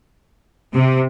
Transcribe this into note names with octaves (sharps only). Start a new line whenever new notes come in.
C3